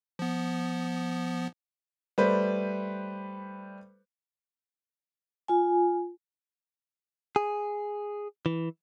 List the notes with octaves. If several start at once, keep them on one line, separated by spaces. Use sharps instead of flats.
F3 B3
G3 A3 B4 C5
F4 G#5
G#4
E3